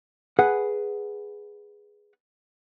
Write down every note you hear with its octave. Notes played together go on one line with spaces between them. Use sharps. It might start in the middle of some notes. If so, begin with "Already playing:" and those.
G#4 B4 F#5